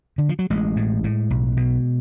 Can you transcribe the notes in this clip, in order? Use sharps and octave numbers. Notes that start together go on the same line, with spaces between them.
D3
F3
F#3
A1 G#3
A2
A2
B1
B2